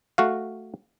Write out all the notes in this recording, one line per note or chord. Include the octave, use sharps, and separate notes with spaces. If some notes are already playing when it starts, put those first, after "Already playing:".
A3 F#4 F5